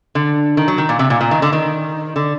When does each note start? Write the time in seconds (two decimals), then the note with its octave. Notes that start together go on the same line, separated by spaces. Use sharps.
0.15 D3
0.57 D#3
0.68 F#3
0.78 D#3
0.89 A#2
0.99 C3
1.10 A#2
1.21 A#2
1.31 D#3
1.42 D3
1.53 D#3
2.16 D3